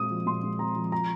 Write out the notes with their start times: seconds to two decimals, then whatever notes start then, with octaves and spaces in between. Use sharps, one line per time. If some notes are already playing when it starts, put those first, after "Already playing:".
Already playing: A#2 G#3 C4 D#6
0.10 F3
0.26 A#2 C6
0.43 G#3
0.59 C4 A#5
0.76 F3
0.92 A#5